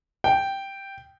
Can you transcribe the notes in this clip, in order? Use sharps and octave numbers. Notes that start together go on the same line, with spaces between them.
G5